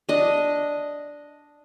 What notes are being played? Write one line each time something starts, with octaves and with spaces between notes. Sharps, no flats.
D4 D#5